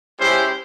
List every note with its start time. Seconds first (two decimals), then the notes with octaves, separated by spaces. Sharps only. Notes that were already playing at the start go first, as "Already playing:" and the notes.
0.19 G#3 C#4 E4 G4 C5